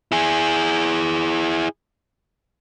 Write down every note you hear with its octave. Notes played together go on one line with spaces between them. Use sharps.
E4 G#4